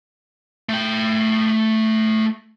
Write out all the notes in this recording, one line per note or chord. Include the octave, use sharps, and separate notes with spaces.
A3 G5